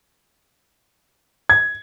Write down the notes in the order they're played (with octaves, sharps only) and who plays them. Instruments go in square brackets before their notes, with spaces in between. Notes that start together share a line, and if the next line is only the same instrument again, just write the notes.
[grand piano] G#6